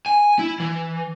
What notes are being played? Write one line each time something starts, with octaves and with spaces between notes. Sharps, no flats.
G#5
E4
E3